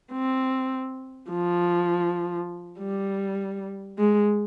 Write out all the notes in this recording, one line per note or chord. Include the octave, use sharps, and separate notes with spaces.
C4
F3
G3
G#3